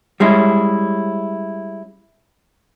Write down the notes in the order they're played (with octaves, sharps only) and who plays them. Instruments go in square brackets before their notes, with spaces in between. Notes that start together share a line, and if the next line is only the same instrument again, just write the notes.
[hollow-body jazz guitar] G3 G#3 C#4 E4